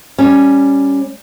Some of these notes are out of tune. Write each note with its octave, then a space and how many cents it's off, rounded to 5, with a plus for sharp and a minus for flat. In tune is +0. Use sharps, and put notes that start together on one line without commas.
G3 +0 C#4 +0